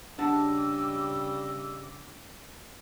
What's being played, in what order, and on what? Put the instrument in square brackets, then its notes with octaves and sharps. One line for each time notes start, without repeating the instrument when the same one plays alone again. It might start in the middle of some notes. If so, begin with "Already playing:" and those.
[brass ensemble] C#3 G3 [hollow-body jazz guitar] D4 F#5 A5 [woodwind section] D#5 D6 [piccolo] E6